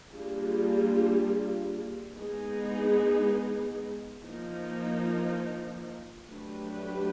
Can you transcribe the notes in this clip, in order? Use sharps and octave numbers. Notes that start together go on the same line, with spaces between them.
G3 A#3 D4 F4 G#4
G#3 B3 D#4 G#4
F3 A#3 D#4
F#3 A3 D4 G4 B4